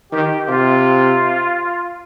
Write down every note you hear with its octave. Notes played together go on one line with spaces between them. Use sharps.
D#3 G4
C3 F4